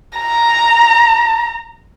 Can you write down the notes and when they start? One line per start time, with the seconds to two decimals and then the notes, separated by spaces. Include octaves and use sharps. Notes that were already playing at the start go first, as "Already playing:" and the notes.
0.18 A#5